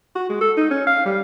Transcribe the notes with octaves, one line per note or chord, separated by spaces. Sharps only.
F#4
G#3
A4
D#4
C#4
F5
G3